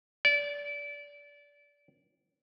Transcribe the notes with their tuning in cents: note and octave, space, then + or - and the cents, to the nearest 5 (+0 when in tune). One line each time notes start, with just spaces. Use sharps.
D5 -25